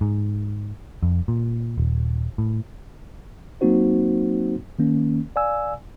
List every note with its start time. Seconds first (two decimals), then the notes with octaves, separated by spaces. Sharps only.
0.01 G#2
1.02 F2
1.28 A#2
1.78 D#1
2.38 A2
3.61 F#3 A#3 C4 D#4 F#4 C5
4.79 D#3 A#3 C#4
5.36 D5 F5 G#5 E6